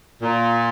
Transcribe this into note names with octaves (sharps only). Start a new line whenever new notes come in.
A#2